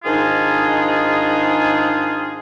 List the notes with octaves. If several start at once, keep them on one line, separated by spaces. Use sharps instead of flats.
G#2 D#3 D4 D#4 F4 G#4